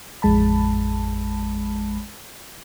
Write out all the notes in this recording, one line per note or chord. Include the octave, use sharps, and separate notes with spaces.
A1 F2 G#3 A5 B5